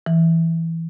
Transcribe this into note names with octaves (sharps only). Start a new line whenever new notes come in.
E3